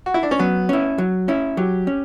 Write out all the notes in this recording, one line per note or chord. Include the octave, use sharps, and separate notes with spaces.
F#4
E4
D4
C#4
F#3 B3
C#4 E4
F#3
C#4 E4
F#3 G4
C#4